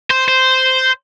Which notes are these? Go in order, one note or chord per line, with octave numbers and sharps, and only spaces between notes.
C5
C5